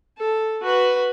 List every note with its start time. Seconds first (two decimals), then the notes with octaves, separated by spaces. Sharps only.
0.18 A4
0.62 F#4 B4